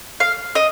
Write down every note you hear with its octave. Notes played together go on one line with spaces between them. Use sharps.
F5
D#5